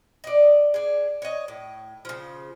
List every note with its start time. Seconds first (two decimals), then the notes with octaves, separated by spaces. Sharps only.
0.24 D5 D#5
0.74 D4 G#4
1.22 C#5 D#5
1.48 A2
2.05 C#3 F3